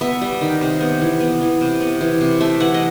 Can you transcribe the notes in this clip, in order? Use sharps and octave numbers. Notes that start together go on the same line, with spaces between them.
B3 E5
G3
D#3
C3
B3
E3
B3
E3
C3
B3
E3
C3
A3 E5
E3 F#5
D#5